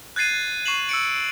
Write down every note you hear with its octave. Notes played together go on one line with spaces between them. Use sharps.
F#6 G#6 A6 C7 D#7
C#6 C7 E7 F#7
E6 C#7 D7